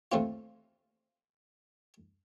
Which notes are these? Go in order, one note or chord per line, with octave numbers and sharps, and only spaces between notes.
D#2 A3 C4 F4